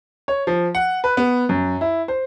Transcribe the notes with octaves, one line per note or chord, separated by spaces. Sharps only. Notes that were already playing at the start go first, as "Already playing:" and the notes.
C#5
F3
F#5
B4
B3
F#2
E4
C5